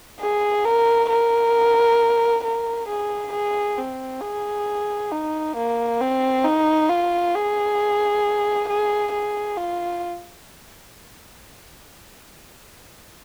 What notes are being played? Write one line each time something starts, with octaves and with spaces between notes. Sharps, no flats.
G#4
A#4
A#4
A#4
G#4
G#4
C4
G#4
D#4
A#3
C4
D#4
F4
G#4
G#4
G#4
F4